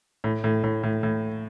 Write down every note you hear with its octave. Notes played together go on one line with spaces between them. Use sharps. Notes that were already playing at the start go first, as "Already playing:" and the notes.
A2
A2
A2
A2
A2